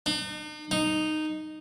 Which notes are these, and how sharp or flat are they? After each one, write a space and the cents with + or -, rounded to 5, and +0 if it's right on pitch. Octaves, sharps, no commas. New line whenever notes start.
D#4 -45
D#4 -10